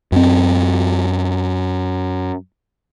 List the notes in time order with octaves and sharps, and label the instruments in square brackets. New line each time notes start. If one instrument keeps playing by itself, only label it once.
[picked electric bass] F#2 C4